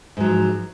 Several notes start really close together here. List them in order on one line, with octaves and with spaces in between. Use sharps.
G#2 F#3 F3